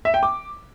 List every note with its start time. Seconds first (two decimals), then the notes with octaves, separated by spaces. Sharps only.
0.05 E5
0.14 G5
0.23 D6